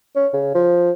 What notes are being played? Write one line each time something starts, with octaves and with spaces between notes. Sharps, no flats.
C#4
C#3
F3